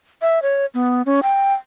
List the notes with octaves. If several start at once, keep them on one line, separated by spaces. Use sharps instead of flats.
E5
C#5
B3
C#4
G5